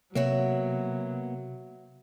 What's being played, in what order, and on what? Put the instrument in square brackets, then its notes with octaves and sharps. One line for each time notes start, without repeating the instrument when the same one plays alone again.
[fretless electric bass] C3 [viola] F#3 [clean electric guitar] A#3 B3 [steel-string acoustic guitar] F#4 C#5 E5